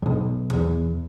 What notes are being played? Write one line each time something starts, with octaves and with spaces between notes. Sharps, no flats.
B1 E2
E2